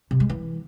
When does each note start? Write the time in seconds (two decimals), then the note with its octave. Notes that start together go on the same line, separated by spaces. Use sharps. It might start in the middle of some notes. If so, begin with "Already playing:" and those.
0.11 C3
0.20 G#3
0.30 E3